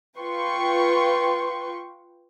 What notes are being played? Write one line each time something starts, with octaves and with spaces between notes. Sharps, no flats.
F4 B4 G5 C6 C#6